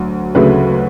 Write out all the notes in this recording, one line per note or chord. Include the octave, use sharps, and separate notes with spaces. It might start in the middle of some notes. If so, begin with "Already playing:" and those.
Already playing: D2 F#3
D2 C#3 F#3 A3 B4